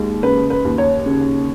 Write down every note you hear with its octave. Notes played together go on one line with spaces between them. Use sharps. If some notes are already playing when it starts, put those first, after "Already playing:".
Already playing: D#2 G#3
C#3 B4
B4
D#2
C#5
C#3